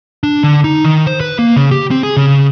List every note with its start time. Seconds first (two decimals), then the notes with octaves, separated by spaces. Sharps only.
0.23 D4
0.43 D3
0.64 D#4
0.85 D#3
1.07 C5
1.20 B4
1.39 A#3
1.56 C#3
1.71 G4
1.91 C4
2.03 G#4
2.17 C#3